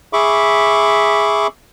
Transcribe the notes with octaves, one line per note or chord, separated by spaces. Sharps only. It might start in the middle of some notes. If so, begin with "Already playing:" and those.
G#4 E5 B5 C#6 D6